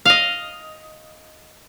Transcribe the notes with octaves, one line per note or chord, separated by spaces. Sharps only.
D#5 F5